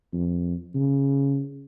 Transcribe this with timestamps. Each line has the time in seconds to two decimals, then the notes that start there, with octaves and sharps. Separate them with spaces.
0.13 F2
0.75 C#3